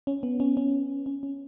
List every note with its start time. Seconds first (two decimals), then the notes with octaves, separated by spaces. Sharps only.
0.07 C#4
0.23 B3
0.40 C#4
0.57 C#4
1.06 C#4
1.23 C#4